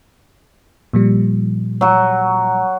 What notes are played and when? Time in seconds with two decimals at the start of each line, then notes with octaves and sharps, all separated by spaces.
0.93 A#2 F3 G3
1.81 F#3 F#4